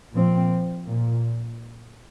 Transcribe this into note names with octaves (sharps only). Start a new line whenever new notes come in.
A#2 F3 C4
A#2